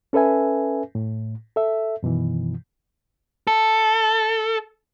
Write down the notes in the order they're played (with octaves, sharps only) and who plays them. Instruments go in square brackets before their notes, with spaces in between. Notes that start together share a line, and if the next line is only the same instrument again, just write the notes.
[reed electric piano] C#4 A4 B4 E5 G#5
A2
A4 E5
F#2 B2 D#3 E3
[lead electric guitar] A4